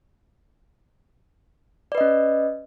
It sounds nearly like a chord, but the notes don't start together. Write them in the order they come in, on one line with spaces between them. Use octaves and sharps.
D5 B4 D#5 C#4